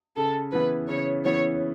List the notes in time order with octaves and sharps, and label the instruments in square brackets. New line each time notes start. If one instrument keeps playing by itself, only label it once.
[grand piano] C#3 [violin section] A4
[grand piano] E3 B3 E4 [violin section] B4
[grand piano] C#3 [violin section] C#5
[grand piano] E3 B3 E4 [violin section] C#5